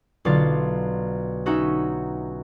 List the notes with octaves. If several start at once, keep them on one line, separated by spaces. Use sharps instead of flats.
B1 D3 F4 A6
C#4 D#4 F#4 E5